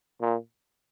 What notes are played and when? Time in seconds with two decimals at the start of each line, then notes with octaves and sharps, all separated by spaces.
0.21 A#2